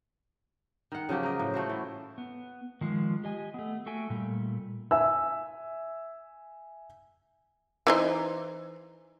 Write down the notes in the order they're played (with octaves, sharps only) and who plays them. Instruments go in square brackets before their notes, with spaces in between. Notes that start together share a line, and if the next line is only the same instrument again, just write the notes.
[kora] D#3 F#5
C#3 F3 F#3 G4
A#3 D#5
A2
A3 F#4 C5
E3
[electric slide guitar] B3
D#3 F3 G#3
G4 D#5 G#5
A3 B3
A3 F#4 A4 E5 G5 G#5
A#2 G3 A3
[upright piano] E5 G#5 E6
[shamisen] E3 D#4 C5